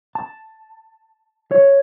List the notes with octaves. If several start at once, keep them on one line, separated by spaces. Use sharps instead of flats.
A5
C#5